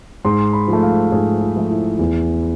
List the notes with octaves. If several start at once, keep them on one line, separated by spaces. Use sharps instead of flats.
G#2 C6
B5
F3
A3
F5
G#2 G#4
F4
F3 A3
E4
E2